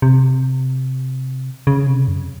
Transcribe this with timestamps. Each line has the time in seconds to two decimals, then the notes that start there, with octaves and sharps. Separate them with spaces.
0.02 C3
1.67 C#3
1.87 C3
2.08 F#2